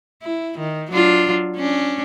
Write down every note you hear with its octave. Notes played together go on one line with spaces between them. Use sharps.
E4
D#3
F#3 D4 F4
C#4 D4